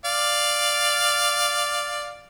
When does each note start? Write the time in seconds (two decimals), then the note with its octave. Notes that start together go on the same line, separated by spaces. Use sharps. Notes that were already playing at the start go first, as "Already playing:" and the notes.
0.05 D5 F5